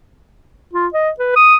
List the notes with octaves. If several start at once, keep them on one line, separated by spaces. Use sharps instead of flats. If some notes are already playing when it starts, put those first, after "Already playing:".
F4
D#5
B4
D#6